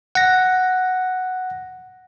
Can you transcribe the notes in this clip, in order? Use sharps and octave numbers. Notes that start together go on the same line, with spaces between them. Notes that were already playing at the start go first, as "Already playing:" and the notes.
F#5 A#6